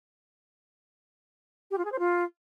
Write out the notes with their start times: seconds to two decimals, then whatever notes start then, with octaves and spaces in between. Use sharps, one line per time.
1.70 G4
1.77 F4
1.84 G#4
1.91 C5
1.98 F4